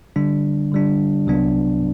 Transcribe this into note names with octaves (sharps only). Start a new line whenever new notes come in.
D3 G3 D4
D3 G3 D4
C2 C3 F#3 B3 D4